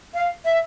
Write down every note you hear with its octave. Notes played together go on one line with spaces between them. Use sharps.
F5
E5